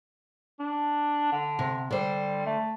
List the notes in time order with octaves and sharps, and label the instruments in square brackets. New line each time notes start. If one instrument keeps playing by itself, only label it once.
[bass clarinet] D4
D3
[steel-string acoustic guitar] C3
[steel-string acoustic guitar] D3 C5 [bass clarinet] G3
[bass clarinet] A3